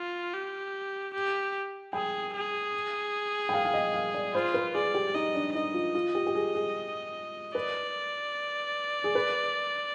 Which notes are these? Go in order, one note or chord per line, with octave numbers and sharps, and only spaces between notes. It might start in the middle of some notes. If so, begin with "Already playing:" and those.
Already playing: F4
G4
G4
G#4 G5
G#4
G5
F5
F5
D#5
F5
D5
F4 C5
B4
G#4 D5
G4
D#4 D#5
D4
D#4 D#5
F4
F4
G4
G4
G#4
G#4
B4 D5
G#4
B4